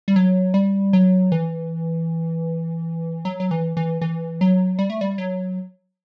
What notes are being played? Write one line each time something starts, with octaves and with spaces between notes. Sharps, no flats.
G3
F#3
G3
F#3
E3
F#3
F#3
E3
E3
E3
F#3
G3
A3
G3
F#3